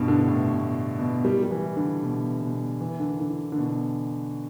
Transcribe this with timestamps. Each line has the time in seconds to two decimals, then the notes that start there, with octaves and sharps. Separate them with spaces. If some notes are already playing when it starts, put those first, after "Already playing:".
Already playing: G2 B2
0.08 D3
0.28 A2
0.47 B2
0.99 B2
1.25 G3
1.43 G3
1.51 E3
1.77 D3
2.03 B2
2.41 B2
2.81 E3
3.00 D3
3.19 D3
3.52 D3
3.58 B2